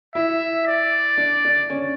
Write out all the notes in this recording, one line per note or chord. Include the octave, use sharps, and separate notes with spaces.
E4 E5
D5
D4
D4
C#4